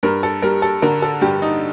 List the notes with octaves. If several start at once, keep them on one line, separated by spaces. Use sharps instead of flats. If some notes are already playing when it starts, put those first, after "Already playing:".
G2 A#4
A4
G3 A#4
A4
D3 A#4
A4
G2 G4
D#4